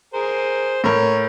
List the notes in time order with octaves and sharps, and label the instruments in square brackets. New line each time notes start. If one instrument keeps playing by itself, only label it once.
[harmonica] G#4 A#4 C5
[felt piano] A2 A#4 [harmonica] C#5